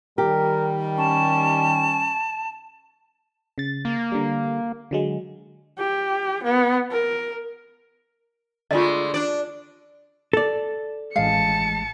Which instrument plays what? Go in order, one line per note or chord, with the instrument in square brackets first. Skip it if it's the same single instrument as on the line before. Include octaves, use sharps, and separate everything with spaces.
[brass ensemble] D#3 G3 [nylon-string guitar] G4 [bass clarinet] A#4
[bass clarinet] C#4 [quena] A5
[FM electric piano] C#3 A6
[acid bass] A#3
[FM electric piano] D3 G3
D3 F#3 G#3
[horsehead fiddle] G4
B3
A#4
[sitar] D3 G#3 A3 [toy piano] F4 D#5
[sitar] D4 D5
[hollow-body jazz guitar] A4 D5
[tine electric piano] A1 G#3 [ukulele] F5 [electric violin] A5 C#7